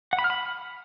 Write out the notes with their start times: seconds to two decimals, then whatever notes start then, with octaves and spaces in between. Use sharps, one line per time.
0.13 F#5
0.19 B5
0.24 F6
0.30 B5